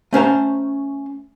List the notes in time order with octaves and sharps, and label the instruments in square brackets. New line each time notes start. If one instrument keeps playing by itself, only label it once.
[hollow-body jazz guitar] A3 C#4 C5 A#5